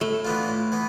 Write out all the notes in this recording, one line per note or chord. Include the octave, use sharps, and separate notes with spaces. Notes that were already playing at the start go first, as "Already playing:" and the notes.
A2 A3
E3 B3 D4 F4
A2
E3 B3